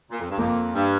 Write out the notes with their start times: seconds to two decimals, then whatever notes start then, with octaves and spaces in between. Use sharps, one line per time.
0.11 A#2
0.20 F2
0.30 G2
0.38 F2 A#3
0.74 G2